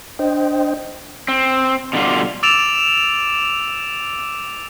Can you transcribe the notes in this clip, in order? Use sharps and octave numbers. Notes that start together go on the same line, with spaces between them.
D4 C5 D#5 G5
C4
B2 D3 G3 F4
D6 E6 A6 D7 E7 F7